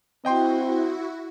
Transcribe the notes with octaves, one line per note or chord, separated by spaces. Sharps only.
C4 E4 F#4 D#5 G5 C6